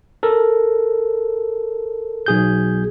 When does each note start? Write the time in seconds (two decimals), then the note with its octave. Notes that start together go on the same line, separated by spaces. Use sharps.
0.23 A4 A#4
2.26 B1 G#4 G6